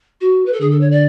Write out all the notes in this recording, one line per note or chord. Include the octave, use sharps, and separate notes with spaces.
F#4
B4
A4
D3 G#4
A4
C#5
D5